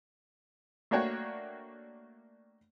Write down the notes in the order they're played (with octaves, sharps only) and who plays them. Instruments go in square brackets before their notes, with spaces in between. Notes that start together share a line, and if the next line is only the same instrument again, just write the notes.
[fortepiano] A3 A#3 D4 F#4 C#5 G5